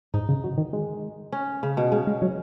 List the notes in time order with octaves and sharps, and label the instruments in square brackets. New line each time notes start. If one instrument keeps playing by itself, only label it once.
[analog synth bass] G#2 [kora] D#4
[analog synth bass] C#3
F#3
D#3
G#3
[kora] C#4
C#3
B2
[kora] C#3 [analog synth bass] G#3
[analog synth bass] G#3
F#3